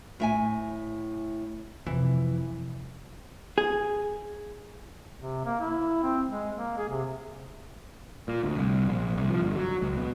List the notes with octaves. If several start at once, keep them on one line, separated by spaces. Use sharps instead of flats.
A2 E5 G#5
F2 C3 E3
G#4
C3
A#3
E4
C4
G#3
A#3
G#4
C3
A#2
D2
C2
A#1
C2
F3
G1
F#3
C#2
B2